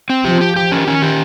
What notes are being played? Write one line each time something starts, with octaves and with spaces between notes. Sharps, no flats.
C4
F3 G4
G4
G4
D#3 C#4
C#4
G4